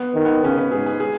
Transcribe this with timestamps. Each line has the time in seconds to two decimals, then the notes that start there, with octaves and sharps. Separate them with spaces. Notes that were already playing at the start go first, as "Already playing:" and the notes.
Already playing: B3
0.15 D#3
0.25 B3
0.44 C#3 C#4
0.57 B4
0.72 G#2 G#4
0.86 G#4
1.00 G#4